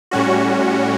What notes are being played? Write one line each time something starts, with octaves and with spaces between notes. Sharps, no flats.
A2 G3 C#4 F#4